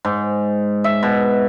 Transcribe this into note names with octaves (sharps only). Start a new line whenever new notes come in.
G#2
E5
B2